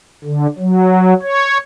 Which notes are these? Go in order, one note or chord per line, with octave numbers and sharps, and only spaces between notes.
D3
F#3
C#5